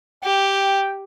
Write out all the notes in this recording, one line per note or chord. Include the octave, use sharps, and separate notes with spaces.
G4 G5